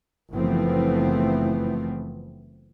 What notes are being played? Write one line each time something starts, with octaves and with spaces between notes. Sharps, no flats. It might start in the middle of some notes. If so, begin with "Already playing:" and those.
F#1 E3 F3 A3 B3 C4